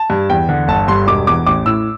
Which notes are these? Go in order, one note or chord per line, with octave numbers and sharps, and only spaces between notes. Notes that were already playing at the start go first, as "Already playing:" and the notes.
Already playing: A5
G2
E2 G5
D3
G1 A5
G2 C6
E1 D6
E2 D6
A1 D6
A2 E6